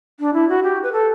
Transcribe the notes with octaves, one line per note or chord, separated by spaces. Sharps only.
D4
E4
F#4
G4
B4
A4